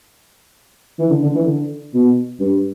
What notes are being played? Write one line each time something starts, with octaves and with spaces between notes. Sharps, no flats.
E3
D3
D3
E3
D3
B2
G2